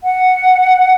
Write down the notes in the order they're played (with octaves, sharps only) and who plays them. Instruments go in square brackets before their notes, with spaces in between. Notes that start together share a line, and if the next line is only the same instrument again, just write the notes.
[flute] F#5